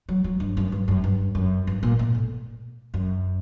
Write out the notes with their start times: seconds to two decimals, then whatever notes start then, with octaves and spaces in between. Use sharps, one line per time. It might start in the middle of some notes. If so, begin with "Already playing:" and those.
0.09 F#3
0.24 F#3
0.40 G2
0.57 F#2
0.72 G2
0.88 F#2
1.04 G2
1.35 F#2
1.67 G2
1.83 A#2
1.99 A#2
2.15 A2
2.94 F#2